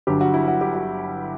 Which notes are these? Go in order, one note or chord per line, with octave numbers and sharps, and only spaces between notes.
G1 G2 F#3 G4
F#4
E4
F#4
G4
F#4